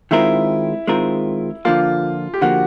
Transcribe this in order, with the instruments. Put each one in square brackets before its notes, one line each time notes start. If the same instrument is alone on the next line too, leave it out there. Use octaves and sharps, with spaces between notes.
[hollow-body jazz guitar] D#3 G#3 C4 F4 A#4 [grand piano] E4
[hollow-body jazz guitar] D#3 G#3 C4 F4 A#4
[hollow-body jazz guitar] D3 F3 A#3 [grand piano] F4
[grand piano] G4
[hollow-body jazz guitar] D3 F3 A#3 [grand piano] F#4